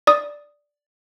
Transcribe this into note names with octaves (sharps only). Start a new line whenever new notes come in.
D5 D#6